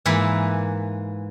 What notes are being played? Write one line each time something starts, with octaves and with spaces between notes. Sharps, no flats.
G#2 E3 A#3 B4 E5